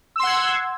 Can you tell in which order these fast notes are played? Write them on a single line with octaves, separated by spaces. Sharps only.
E6 C6 F#5 G#6